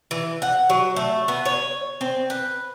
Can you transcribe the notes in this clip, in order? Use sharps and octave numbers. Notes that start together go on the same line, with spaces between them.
E3
F#5
F#3
A3
B3
C#5
C4
B4